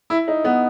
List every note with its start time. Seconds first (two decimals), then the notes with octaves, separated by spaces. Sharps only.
0.10 E4
0.28 D#4
0.44 B3